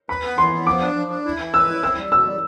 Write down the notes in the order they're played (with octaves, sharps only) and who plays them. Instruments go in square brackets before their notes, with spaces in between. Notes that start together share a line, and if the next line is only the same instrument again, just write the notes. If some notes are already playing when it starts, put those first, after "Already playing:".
[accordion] B4 [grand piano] B5
[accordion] B3
[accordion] E3 [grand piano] C6
[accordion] B3
[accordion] F3 [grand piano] D6
[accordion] D4
F3
D4
E4
E3
[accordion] B4 [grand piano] E6
[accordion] E4
[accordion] C4 [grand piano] E6
[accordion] G3
[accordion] B2 [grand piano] E6
[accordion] G3